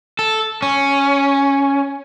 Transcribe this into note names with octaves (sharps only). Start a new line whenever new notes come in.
A4
C#4